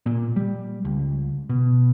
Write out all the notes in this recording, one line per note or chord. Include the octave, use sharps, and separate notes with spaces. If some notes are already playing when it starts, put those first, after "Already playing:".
A#2
G3
C#2
B2